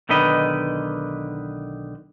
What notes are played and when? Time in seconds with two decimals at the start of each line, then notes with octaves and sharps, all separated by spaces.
0.09 B1 D3 D#3 B4 D#5